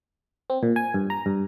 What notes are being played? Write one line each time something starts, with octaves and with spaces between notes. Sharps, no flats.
C4
A#2
G#5
G2
A#5
G2